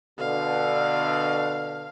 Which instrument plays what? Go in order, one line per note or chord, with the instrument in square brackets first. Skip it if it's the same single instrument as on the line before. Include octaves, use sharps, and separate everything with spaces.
[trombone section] B2 D3 [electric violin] F5